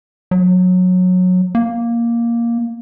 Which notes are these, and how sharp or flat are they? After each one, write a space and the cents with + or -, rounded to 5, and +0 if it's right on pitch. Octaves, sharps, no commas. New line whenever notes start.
F#3 -20
A#3 +5